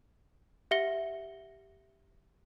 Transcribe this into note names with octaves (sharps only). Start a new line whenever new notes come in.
G4 E5 F#5 A#6 C#7 G7